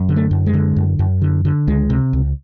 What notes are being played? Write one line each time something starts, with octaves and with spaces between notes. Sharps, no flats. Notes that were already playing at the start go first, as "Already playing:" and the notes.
Already playing: F#2
D3
A3
F#2
G#3
D3
F#2
F#2
D3
D3
C#2 G#3
C3
C#2